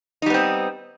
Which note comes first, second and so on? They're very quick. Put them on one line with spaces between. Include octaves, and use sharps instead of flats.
D#4 G3 B3 C4